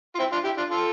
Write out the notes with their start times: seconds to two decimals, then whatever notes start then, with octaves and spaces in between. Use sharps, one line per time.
0.15 F4
0.19 C4 E4
0.32 D4 F4
0.44 E4 G4
0.57 D4 F4
0.70 F4 A4